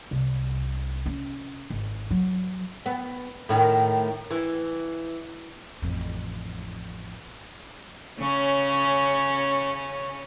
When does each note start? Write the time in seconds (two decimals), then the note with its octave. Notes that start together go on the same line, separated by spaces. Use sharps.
0.11 C2
1.06 C#4
1.70 G#1
2.11 F#3
2.86 B3
3.49 A2 D#3
4.31 E3
5.82 A1 F2
8.19 C#3 C#4